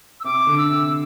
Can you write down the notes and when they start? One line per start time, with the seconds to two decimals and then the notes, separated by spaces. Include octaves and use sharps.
0.20 E6
0.24 C3 D6
0.47 D3
0.58 E6
0.69 C3